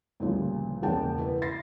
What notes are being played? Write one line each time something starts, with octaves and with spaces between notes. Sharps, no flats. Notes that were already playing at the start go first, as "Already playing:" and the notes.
D2 G2 A#2 C#3 F3
E1 A#1 C#3 F#5 G5 A5
E4 B4
A6 A#6 C7